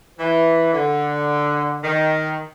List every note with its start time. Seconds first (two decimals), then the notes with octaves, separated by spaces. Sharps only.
0.18 E3
0.73 D3
1.83 D#3